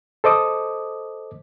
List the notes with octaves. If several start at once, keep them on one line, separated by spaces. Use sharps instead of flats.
A4 C5 D#5 D6 D#6